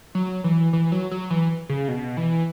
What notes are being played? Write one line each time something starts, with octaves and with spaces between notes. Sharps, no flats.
F#3
E3
E3
F#3
F#3
E3
C#3
B2
E3